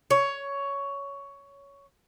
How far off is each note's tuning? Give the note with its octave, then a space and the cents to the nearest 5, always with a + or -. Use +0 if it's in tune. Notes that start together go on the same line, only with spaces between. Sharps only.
C#5 +10